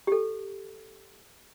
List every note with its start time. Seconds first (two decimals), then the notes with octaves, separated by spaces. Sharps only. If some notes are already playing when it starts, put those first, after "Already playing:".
0.07 G4 A4